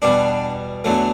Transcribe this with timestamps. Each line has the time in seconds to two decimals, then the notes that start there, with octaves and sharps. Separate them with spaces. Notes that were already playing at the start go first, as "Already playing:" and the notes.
0.02 E2 B2 G3 D4
0.84 E2 D3 F#3 A3